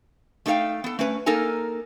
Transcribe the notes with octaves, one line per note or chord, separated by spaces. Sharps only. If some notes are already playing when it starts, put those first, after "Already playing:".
A3 D#4 E4 A4 F5 G5
B3 A4
A3 C#4 B4
A#3 D#4 A4 A#4 G#5